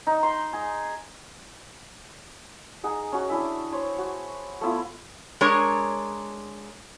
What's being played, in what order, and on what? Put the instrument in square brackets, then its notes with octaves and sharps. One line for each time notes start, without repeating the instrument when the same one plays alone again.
[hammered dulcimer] D#4
C6
G#4
[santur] D#4 G#4 F#5
C#4 F#4
D4 E4 E5
C5 C#5
F#4
A3 B3 E4 F4
[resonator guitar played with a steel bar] G#3 D4 A#4 C#5